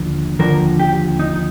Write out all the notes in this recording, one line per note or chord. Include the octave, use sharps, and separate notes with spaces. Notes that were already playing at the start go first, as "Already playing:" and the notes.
Already playing: D#2 D3 F3
D#2 D3 F3 A#4
G4
D#4